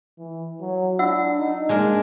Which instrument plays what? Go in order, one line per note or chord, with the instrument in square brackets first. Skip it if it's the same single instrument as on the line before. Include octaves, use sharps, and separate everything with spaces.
[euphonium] E3
F#3
[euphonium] D4 [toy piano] F4 F#5 E6
[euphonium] D#4
[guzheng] G#3 D4 A#4 [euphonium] A#3